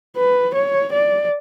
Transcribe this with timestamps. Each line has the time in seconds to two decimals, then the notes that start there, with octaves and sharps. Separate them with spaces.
0.17 B4
0.55 C#5
0.93 D5